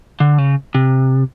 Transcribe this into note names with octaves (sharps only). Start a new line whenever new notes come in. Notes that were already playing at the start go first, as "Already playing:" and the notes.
D3
C#3
C3